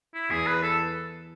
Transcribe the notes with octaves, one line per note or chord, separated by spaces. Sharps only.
E4
E2 G#4
B4
A4